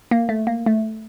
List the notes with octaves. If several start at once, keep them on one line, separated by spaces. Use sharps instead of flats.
A#3
A3
A#3
A3